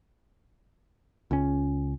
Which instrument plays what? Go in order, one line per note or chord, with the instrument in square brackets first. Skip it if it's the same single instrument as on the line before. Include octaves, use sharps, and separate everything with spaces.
[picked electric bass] C#2 C#4